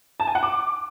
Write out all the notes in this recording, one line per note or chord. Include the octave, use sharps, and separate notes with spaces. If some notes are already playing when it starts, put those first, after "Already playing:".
A5
G#5
F#5
D6